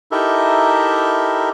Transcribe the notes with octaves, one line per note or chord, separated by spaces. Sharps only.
D#4 E4 G4 A4 A#4 E5